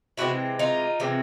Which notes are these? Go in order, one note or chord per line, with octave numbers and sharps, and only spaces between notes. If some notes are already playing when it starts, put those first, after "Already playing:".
C3 E3 G#3 C4 E4 F#4
D#4 F4
C3 E3 G#3 C4